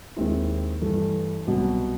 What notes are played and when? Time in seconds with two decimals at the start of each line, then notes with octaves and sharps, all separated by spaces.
0.17 D#2 D#3 G#3 C4 E4
0.82 G2 E3 A3
1.47 C2 B2 F#3